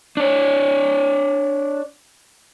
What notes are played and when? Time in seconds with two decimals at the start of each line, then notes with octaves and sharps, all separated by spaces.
0.17 D4 C#5